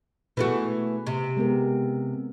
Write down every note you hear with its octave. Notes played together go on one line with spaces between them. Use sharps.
B2 E3 A3 F#4 G#4
C3
G#3 B3 A#4